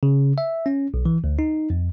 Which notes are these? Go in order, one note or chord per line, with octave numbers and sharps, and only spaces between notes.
C#3
E5
C#4
B1
E3
D2
D#4
F2